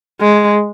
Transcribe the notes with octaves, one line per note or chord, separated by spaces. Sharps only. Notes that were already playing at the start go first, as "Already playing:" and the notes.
G#3